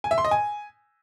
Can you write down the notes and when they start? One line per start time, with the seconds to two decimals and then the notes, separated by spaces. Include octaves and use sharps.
0.04 G#5
0.11 E5
0.18 C6
0.25 D#5
0.31 G#5